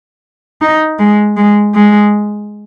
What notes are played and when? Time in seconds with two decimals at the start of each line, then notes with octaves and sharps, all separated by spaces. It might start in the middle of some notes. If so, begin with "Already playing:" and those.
0.62 D#4
0.99 G#3
1.37 G#3
1.75 G#3